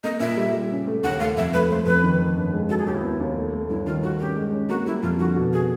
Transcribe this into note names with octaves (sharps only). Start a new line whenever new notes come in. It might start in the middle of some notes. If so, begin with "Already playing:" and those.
A#3 D#5
A#2 E5
G3
G3
C#3
A3
D#2 F#5
A3 F5
F2 E5
A3 B4
A3 C5
F2 B4
D#3
D#3
G1
G#3
F#3 A4
G#4
D#2 G4
E4
B3
D#2
A3
A3
G2 E4
D#3 F4
D#3 F#4
C#4 G4
G#3
C#4
A#3 F#4
G3 E4
F2 F4
D3 F#4
B2
B2 G#4